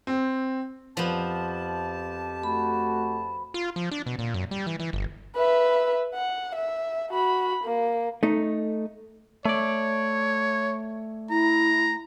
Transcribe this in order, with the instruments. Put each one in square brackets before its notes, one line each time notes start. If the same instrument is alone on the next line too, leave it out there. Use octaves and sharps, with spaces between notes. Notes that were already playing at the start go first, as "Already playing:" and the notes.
[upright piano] C4
[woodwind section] F2 G4 A5 [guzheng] F3 B3
[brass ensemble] A3 F#4 [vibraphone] B5
[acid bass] F4
F3
D4
B2
A#2
F#2
G3
E3
E3
G1
[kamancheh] B4 E5
F#5
E5
F#4 B5
A#3
[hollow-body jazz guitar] A3 D#4
[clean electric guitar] A3 D5 [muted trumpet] C#5
[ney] E4 [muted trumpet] A#5